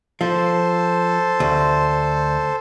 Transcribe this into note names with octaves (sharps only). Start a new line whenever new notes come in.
F3 A4 C5
D2